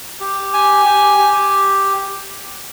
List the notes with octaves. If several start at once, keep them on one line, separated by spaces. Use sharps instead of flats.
G4
G#5
G4
G4